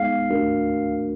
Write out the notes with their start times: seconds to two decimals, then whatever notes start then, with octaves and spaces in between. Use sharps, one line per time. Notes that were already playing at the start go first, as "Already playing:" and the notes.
Already playing: G#3 B3 D#4 G#4 F5
0.30 A3 D4 F#4 A#4